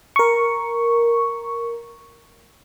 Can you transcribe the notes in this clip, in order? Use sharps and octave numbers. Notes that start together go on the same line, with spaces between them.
A#4 C#6